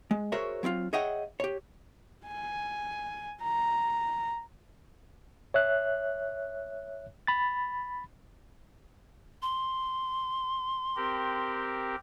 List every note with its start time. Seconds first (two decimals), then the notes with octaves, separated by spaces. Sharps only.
0.11 G#3
0.32 F#4 G#4 A#4 C5 C#5 E5
0.63 F#3 C4 E4 F4
0.93 G#4 C#5 D#5 E5 F#5 G5
1.40 G4 C#5
2.27 G#5
3.43 A#5
5.54 C#5 E5 F#6
7.27 B5 A6
9.42 C6
10.96 C4 G4 A#4